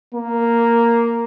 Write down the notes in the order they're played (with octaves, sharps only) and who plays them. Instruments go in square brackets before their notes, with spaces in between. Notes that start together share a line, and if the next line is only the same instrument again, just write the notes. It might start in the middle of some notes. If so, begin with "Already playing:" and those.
[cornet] A#3